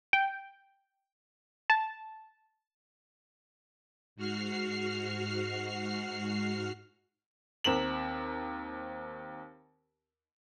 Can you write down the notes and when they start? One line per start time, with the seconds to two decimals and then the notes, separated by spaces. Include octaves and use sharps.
0.13 G5
1.70 A5
4.16 G#2 F#4 F6 C7
7.64 D#2 C4 A#4 E7 F#7